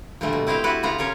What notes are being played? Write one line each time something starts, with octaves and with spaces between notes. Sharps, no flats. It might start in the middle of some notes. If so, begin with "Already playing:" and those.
A#2 D3 F3 G3 A3
B2
C4 E4 D#5 F5 G5
E4 F#4 G4 B4 D5
C#3 B3 F4 A#5
C#4 F4 A#4 C#5